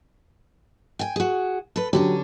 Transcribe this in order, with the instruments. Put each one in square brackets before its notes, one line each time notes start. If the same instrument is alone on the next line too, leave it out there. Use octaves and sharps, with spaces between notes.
[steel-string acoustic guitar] G5 G#5
F#4 G#4
A4 B4
[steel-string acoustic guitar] D3 C#4 D4 [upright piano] F#3 G4